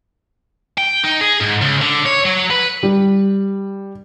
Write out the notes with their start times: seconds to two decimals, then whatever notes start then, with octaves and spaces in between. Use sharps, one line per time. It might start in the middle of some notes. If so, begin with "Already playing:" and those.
0.78 G5
1.04 D#4
1.21 G#4
1.41 G#2
1.62 C#2
1.82 D3
2.06 C#5
2.25 F#3
2.50 B4
2.83 G3